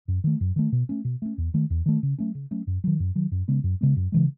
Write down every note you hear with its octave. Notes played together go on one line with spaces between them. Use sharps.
F#2
D#3 A3
F#2
D#3 A3
B2
A3 C#4
B2
A3 C#4
E2
D#3 A3
E2
D#3 A3
C#3
F#3 A3 C#4
C#3
F#3 A3 C#4
F#2
D#3 F#3
F#2
D#3 F#3
F#2
C#3 G#3 B3
F#2
C#3 G#3 B3
F#2
C#3 E3 G#3